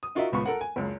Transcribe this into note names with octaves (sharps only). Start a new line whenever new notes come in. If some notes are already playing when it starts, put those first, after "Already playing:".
D#6
D#4 F4 F#4 A#4 D#5 E5
D#1 C#2 B3 B5 C#6
A4 A#4 F#5
G#5
F#1 C#2